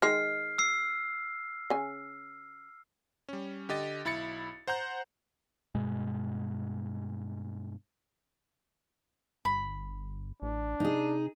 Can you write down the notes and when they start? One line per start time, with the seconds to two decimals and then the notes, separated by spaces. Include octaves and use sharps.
0.02 D#3 G#3 F6 C7
0.58 E6 C7
1.70 C#3 G#5
3.29 G3 C#4
3.69 D3 G4 D#5 A6
4.05 B1 E4 B5 A6 C#7
4.67 C5 F#5 A#5 G6
5.75 G2 B2 G#3
9.45 G1 B5
10.42 A1 D4
10.80 C3 D#4 G#4